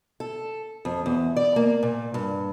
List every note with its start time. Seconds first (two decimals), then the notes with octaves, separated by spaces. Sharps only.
0.20 A4
0.85 F2
1.06 E2
1.36 D5
1.56 A#3
1.83 A#2
2.14 G2